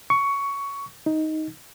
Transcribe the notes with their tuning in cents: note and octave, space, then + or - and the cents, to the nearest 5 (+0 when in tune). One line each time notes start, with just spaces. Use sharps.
C#6 +15
D#4 +5